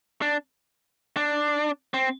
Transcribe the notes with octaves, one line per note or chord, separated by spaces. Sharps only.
D4
D4
C4